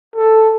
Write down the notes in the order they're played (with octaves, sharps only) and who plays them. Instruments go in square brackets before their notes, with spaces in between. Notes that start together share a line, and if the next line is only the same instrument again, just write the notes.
[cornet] A4